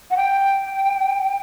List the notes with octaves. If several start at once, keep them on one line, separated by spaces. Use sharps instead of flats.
F#5
G5